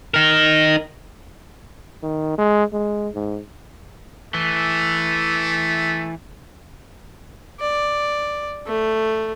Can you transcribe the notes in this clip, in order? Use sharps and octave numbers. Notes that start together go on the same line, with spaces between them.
D#4 A#4
D#3
G#3
G#3
G#2
E3 A3
D5
A3